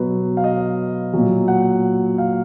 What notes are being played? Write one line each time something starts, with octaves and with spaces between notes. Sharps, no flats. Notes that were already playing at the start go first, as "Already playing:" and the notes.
Already playing: B2 F#3 B4
F5
D#5
A#2 F#3
F#5
F5